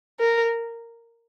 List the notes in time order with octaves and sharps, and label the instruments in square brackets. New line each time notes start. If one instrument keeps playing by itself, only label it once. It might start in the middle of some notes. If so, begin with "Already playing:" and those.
[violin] A#4